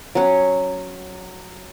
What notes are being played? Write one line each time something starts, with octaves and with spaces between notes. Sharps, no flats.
F#3 C#4